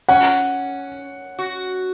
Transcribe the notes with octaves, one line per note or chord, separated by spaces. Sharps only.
C#4 F#5
F#4